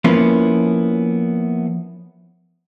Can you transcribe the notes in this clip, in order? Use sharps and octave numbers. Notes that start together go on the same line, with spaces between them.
F3 A#3 B3 C#4 E4